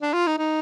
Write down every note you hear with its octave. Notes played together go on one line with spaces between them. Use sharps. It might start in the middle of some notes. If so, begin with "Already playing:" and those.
D4
F4
D#4
D#4